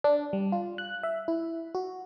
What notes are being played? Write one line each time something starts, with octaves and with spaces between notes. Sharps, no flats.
D4
G3
F4
F#6
E5
E4
F#4